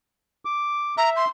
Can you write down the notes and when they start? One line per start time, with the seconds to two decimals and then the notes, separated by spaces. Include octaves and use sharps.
0.45 D6
0.98 E5 A#5
1.16 C6